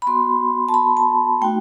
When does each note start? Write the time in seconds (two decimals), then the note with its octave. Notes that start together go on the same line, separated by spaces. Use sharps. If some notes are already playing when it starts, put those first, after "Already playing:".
0.02 B5
0.07 B3 F#4 C6
0.69 A5
0.74 B5
0.97 A5
1.41 A3 D#4 F#4 G5